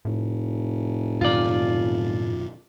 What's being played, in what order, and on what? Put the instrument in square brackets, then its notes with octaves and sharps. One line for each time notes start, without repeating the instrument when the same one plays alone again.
[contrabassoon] F1 [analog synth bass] A2
[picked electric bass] F#2 B2 D#3 [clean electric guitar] F4 D5